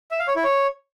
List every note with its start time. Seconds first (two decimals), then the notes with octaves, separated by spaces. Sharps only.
0.11 E5
0.19 F5
0.28 C#5
0.36 E4
0.44 C#5